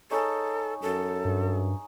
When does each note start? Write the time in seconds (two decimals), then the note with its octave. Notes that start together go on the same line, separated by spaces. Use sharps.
0.11 D#4 G#4 A4 C#5
0.82 F#2 A4
1.25 G2